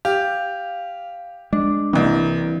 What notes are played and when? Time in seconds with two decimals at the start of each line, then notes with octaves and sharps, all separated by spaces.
0.05 G4 F5
1.53 G#3 D4
1.93 C2 E3 A#3 C4 D#4